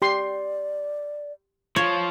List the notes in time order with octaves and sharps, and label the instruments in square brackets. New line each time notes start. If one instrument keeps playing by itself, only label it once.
[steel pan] G4 C6 [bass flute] D5
[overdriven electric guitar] F3 [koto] C#5